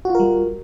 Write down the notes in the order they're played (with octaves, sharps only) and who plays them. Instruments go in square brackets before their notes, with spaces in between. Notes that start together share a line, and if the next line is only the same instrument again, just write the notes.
[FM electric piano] F#4
F4
A#4
G3